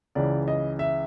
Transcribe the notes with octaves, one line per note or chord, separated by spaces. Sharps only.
C#2 C#3 E3 D5
D#5
E5